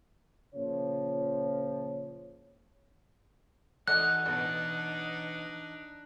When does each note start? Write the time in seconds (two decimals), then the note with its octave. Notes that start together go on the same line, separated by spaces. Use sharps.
0.55 A#2 C#3 F3 F4 C#5
3.88 E3 D#4 F#4 A4 D5 D#5 F#5 F#6
4.26 A1 B2 D4 D#4